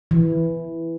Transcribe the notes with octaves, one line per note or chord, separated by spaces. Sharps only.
E3